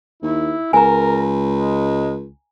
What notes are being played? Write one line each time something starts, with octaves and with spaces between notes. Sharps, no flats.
D#2 E4
C#2 A#4 G#5 A#5
G#3